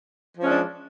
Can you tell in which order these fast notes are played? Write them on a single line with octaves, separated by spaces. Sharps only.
F3 C#4 G#3 D4